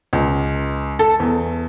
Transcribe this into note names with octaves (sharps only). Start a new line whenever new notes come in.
C#2
A4
E2